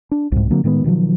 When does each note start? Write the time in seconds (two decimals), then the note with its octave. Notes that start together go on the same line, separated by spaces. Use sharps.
0.11 D4
0.32 C2 G#2
0.50 D3 F#3 A#3 C4
0.64 A2 D#3 G#3 B3
0.84 B2 D#3 F3 F#3